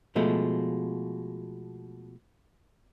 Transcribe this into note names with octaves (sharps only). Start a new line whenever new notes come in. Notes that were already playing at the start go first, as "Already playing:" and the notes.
B2 F3 G#3 A3